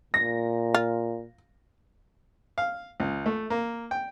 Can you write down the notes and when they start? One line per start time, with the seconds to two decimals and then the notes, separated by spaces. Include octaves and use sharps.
0.14 A#2 A#6
0.74 F4
2.58 F5
3.00 C#2
3.26 A3
3.50 A#3
3.91 G5